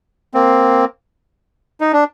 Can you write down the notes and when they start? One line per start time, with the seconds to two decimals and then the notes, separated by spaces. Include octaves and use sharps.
0.34 A#3 C4
1.81 D#4
1.93 D4